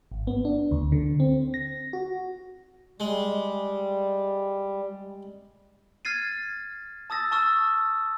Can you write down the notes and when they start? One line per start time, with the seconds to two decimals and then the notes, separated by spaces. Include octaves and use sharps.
0.12 G#1
0.27 B3
0.45 D4
0.71 D2
0.92 D3
1.20 C4
1.54 A#6
1.93 F#4
3.00 G3 G#3
6.05 F6 G#6 A6 C7 D#7
7.10 A5 D#6 E6 A6 A#6
7.32 A5 C#6 E6 F6